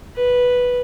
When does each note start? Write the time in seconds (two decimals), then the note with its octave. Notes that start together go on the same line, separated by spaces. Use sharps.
0.15 B4